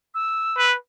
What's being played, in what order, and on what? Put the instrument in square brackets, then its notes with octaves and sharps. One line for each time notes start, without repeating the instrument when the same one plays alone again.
[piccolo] E6
[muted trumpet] B4